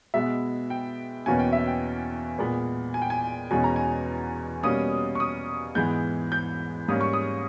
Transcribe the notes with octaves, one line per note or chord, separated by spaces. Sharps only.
B2 G#3 B3 E5
G5
E2 B2 A#3 C#4 G#5
G5
E5
G5
A#2 G#3 B3
G#5
G5
G#5
E2 B2 G#3 C#4 G#5
A#5
G#5
B2 G3 A#3 C#4 D#6
C#6
D#6
G#2 E3 G#3 B3 G6
G6
G#2 G3 A#3 C#4 D#6
C#6
D#6